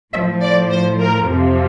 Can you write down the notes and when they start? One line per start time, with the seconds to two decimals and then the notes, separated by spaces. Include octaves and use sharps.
0.14 A2 F3 E5
0.43 D5
0.71 C5
1.01 A#4
1.29 F2 C3 F3